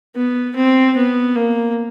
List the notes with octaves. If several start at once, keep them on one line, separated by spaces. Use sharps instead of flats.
B3
C4
B3
A#3